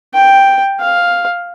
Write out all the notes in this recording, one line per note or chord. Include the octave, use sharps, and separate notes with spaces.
G5
F5